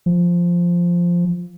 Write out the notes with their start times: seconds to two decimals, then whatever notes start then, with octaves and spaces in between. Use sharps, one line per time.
0.06 F3